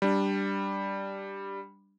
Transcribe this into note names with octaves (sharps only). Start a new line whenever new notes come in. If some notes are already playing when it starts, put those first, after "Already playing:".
G3 D4